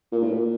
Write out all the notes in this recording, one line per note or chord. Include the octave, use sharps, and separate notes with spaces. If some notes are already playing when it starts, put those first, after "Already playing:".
A#2
A2
A#2